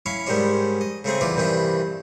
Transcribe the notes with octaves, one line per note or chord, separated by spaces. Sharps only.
C#4 E4 C#5 F5
G#2 D#3 G3 G#3 C#4 D4
D#5
C#3 A3 C4 G#4
E2 E3 F4 D5 D6
G2 C3 D#3 E3 D4